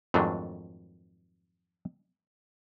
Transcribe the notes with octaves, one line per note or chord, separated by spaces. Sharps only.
F2 G#2 D#3 F#3 A3 D4